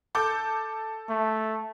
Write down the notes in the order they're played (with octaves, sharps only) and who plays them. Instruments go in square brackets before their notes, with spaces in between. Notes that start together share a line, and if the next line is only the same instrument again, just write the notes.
[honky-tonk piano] A4 D6 G6
[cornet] A3